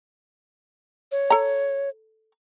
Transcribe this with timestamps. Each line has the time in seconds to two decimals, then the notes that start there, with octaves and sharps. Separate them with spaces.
1.12 C#5
1.30 A4 A#5